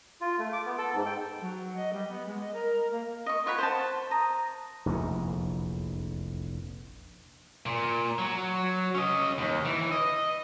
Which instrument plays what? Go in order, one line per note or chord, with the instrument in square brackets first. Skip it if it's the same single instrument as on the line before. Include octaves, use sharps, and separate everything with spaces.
[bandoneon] F4
A3
D6
B3
A4
G#2
G5
[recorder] F#3
D#5
G3
B3
G#3
D#5
A#4
A#3
[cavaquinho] D#5 C#6
F4 C#5 F#5 B5
C5 A5
A#5 D#6
[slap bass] F1 A#1 E2 D3
[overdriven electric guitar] A#2
F#3
C#4 D#5
D#2
E3
D#5